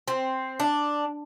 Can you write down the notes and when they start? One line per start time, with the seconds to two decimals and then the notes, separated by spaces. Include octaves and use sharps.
0.08 C4
0.60 D4